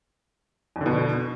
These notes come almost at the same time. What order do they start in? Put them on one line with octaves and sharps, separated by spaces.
F2 D3 B2